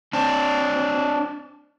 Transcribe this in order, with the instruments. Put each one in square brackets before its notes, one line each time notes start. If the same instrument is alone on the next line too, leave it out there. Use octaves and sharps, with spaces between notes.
[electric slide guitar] C4 D4